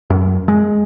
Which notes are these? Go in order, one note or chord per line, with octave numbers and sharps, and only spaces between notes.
F#2
G#3